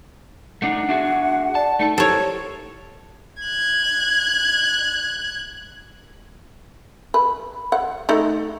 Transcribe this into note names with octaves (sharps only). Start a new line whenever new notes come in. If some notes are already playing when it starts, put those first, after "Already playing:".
A3 D4 D#4 F#5
D4 F#4 G#4 E5
D5 A5
A3 D#4 A4 A5
E4 G4 A4 A#4 C5 C#5
F#6 G#6
B4
F#5
A3 D#4